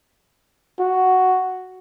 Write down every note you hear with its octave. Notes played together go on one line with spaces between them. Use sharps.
F#4